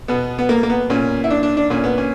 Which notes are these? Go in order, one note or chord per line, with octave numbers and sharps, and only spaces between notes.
B2 B3
B3
A#3
A#3
B3
A#2 C#4
E4
D4
D4
D4
A#2 C#4
B3
C#4